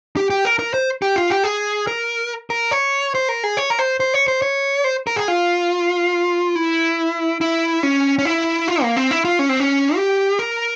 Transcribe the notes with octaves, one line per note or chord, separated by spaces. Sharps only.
G4
G4
A#4
A#4
C5
G4
F4
G4
G#4
A#4
A#4
C#5
C5
A#4
G#4
C#5
A#4
C5
C5
C#5
C5
C#5
C5
A#4
G#4
F4
E4
E4
C#4
C#4
E4
F4
A#3
C4
E4
F4
C#4
C4
C#4
G4
A#4